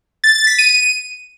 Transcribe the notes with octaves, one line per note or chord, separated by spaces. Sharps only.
A6
A6
B6
D#7